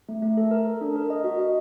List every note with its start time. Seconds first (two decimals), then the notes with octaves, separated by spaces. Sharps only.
0.09 A3
0.22 A3
0.37 A4
0.51 A#4
0.66 A#4
0.81 D4
0.96 A#4
1.10 D#5
1.24 F#4
1.39 D#5